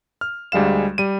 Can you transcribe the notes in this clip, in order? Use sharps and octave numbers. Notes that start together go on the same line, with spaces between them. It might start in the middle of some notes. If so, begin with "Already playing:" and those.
F6
D2 G3 G#3 F5 E7
G3 D#7